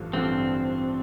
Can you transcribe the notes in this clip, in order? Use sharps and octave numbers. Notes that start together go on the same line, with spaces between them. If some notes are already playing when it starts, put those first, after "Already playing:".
Already playing: A1 G2 D3 F3
A1 G2 D3 F3 C4